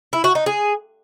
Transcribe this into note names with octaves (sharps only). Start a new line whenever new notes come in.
E4
F#4
D#4
G#4